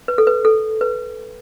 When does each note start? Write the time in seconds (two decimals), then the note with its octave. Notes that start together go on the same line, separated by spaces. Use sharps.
0.08 B4
0.18 A4
0.27 B4
0.45 A4
0.81 B4